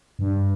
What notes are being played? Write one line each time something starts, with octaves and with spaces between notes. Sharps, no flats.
G2